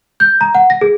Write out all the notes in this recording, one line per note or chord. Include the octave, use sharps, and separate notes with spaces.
G6
A#5
F#5
A#6
G#4